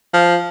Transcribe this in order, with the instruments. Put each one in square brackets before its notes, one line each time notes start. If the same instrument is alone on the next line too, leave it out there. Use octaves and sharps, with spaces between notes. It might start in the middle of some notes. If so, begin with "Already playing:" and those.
[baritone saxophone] F3